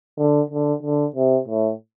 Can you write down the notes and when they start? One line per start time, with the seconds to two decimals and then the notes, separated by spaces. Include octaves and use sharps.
0.18 D3
0.51 D3
0.83 D3
1.16 C3
1.48 A2